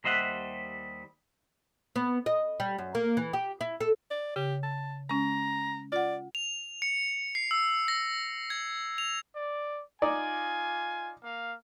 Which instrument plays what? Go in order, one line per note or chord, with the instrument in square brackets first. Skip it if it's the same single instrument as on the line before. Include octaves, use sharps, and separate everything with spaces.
[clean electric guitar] D#2 G3 C5 D#5 E5 F#5
[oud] B3
D#5
G3
F#2
A#3
E3
G4
E4
A4
[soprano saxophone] D5
[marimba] C#3 [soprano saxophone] G4
[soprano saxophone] A5
[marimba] G#3 C#4 [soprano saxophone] A#5
[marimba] F4 F#5 [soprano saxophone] D5
[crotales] F7
C#7
C7
E6
A#6
G#6
F7
[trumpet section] D5
[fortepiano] D#4 D5 [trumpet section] F4 G#5
[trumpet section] A#3 F5